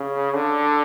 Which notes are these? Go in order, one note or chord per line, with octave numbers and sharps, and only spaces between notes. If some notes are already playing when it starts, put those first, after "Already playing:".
Already playing: C#3
D3